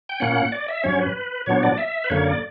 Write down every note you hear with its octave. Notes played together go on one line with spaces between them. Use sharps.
G5
A#2 A#3 C#4 F#5
D5
E5
G2 F#3 C#4 C#5
B4
A#2 F#3 B3 D4 C#5
D5
E5
B4
F#2 D3 A#3 C#5
D5